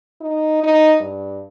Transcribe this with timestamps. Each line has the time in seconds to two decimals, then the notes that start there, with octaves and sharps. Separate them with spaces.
0.21 D#4
0.63 D#4
1.00 G2